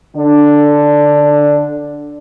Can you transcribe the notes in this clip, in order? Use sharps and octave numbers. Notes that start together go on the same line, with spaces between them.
D3 D4